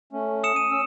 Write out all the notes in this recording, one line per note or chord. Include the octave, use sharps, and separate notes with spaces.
A3 C#4
D#6 C#7 E7
D#7
C#4 E6